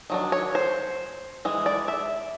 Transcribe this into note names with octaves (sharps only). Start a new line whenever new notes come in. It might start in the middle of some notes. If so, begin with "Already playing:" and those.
D#3 F#3 D4
C#5
C5
E3 G#3
D5
E5